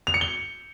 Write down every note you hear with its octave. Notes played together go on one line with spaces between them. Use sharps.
F7
C#7
G7